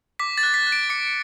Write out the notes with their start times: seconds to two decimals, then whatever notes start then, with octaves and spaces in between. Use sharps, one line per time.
0.19 D6 B6
0.38 A6
0.43 F#6
0.54 B6
0.67 F#6
0.72 D7
0.90 D6 C#7